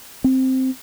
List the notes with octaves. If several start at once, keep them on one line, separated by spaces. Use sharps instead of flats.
C4